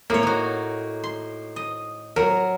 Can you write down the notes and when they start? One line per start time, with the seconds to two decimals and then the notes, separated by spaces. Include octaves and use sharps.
0.10 A2 A#3 C#5
0.23 D#4 F#4
1.04 C6
1.56 D#5
2.16 F#3 A#4